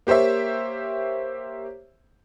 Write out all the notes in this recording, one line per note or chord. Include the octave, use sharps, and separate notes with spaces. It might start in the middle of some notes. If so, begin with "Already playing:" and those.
A#3 G4 C5 C#5 E5